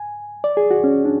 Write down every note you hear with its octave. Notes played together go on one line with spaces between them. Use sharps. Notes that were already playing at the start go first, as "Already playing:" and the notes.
Already playing: G#5
D5
G#4
F#4
C#4
D4